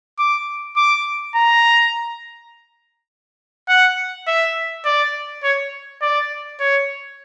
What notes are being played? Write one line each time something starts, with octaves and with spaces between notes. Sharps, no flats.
D6
D6
A#5
F#5
E5
D5
C#5
D5
C#5